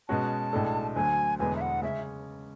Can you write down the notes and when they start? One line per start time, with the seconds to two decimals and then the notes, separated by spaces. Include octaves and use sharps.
0.09 B2 G#3 C#4 F#4 A5
0.53 B1 A2 G#3 D4 A4
0.95 D2 D3 F#3 G#5
1.39 E1 E2 D3 G#3 B3 G#5
1.56 E5
1.61 F#5
1.82 C#3 G#3 C#4 E5